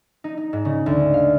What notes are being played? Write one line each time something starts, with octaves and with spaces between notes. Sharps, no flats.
D#4
D#4
G#2
C#3
D2
F5